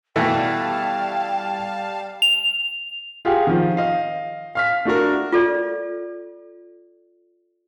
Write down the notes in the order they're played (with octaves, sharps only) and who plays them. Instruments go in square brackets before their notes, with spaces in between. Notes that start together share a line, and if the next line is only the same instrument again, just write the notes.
[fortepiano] B2 E3 A3 [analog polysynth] G3 F5 A5 [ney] G5
[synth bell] F7
[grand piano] F4 G4 G#4 F5 F#5
D#3 F3
D#5 F5
F5 F6 B6
A3 D4 F#4 A#4
[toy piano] F4 A4 D5